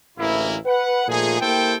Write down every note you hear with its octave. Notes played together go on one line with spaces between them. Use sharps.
A1 D2 E3 A#3 E4
B4 F#5
A#2 F3 A3 D#4 G#4
A#3 E4 G4 A4 C5 G5